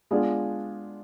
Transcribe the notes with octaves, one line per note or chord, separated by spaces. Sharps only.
G#3 B3 D4 F4 G#4